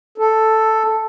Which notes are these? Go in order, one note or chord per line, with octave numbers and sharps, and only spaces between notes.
A4